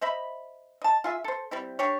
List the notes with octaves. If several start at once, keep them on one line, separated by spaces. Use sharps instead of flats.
C5 D#5 E5 B5
D#5 A5
F4 G#4 E5
A4 C5
G3 C4 E4
D4 G4 C#5